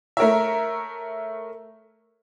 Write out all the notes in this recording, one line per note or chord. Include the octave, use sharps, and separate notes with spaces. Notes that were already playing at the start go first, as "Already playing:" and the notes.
A3 A#4 C#5 E5